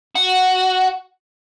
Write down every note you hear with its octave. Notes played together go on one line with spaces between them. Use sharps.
F#4